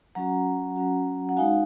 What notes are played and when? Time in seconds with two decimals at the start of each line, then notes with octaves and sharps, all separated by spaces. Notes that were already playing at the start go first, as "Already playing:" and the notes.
0.15 F#3 C#4 F#4 F#5 A#5
0.76 F#3 C#4 F#4
1.29 F#5
1.37 G#3 D#4 F#4 F5 G#5